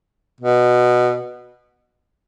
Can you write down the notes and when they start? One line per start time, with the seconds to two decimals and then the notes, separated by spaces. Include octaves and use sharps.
0.41 B2